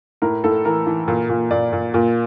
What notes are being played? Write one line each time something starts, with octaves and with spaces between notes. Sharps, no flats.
A2 A#4
A2 A4
E3 A#4
E3
A#2
A#2
A#2 D5
A#2
A#2